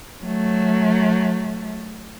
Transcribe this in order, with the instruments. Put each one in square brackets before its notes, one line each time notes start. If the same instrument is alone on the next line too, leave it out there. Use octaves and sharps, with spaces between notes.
[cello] F#3 A3